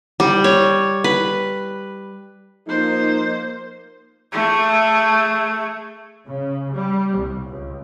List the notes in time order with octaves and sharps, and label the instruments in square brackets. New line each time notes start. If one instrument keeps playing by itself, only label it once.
[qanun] G3
C#5
B4
[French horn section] F3 D#4 [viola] A#3 C5
[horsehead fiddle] A3 G#4
[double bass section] C#3
G3
C2
C#2